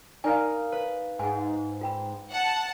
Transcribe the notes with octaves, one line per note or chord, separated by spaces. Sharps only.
D#4 A#4 D5 F5 G#5
B4
G#2 F#5 G#5
F4 G5 B5
F#5 A5